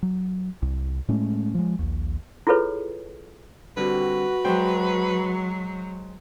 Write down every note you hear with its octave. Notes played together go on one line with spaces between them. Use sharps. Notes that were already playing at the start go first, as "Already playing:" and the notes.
F#3
C2
A2 G#3 A3 C#4
F3 G#3
A#1 D#2
E4 F4 G#4 A4 B4 C#5
D3 G3 C4 F#4 B4
F#3 G#3 C5 G5